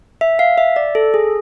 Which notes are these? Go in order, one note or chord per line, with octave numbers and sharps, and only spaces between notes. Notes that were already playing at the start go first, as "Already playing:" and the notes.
E5
F5
E5
D5
A4
G#4